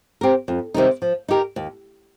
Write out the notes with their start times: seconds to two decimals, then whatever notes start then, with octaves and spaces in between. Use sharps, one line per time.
0.21 C4 G4 A#4
0.48 F2
0.74 C3 D#3 G3 D#4
1.02 F3
1.28 D#4 G4 A#4
1.56 D#2